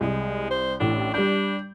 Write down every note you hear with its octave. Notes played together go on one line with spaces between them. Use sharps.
C2 G#3
C5
A1 A2 D4
G3 D4 G6